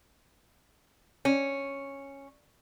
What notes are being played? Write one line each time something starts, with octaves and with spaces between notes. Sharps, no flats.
C#4